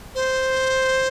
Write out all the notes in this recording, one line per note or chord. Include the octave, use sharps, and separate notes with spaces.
C5